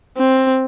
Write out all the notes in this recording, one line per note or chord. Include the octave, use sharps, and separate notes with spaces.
C4